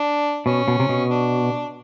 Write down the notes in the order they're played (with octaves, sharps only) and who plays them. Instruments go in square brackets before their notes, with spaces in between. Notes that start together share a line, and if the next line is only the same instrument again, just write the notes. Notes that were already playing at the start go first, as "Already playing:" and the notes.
Already playing: [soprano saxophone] D4
[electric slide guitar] B2 [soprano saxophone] C#4
[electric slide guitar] B2
C3
B2
[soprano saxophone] D4